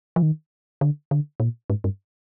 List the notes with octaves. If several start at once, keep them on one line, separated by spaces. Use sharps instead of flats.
F3
D#3
D3
D3
A#2
G#2
G2